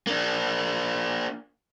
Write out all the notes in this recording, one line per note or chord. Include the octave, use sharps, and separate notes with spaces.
A#3 D4